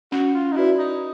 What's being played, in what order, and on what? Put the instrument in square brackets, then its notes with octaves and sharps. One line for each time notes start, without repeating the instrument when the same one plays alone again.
[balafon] C#4 [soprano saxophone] F#4
[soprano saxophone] F4
D#4
[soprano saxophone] E4 [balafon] F#4 B4 D5
[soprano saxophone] D#4